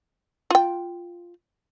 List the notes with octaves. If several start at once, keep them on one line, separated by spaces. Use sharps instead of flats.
F4 G5